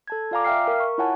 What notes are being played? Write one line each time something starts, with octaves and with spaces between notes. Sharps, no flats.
A4 A5 G#6
F4 D5 F5 G#5 A#5 D6
E5 F5 G5 F6 C7
A#4
C#6
E4 F4 C#5 F#5 G#5 A5